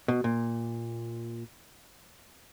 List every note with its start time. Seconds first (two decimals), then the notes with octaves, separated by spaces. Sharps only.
0.08 B2
0.24 A#2